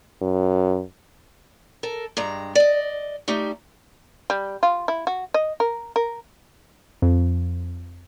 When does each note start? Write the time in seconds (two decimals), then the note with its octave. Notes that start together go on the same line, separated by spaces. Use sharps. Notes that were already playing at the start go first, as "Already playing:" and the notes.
0.22 F#2
1.83 A4 A#4
2.17 G2 G#3 A#5
2.55 D5 D#5
3.28 G3 A3 D#4 G4
4.30 G3
4.63 F4
4.88 E4
5.07 F#4
5.34 D#5
5.60 A#4
5.96 A#4
7.02 F2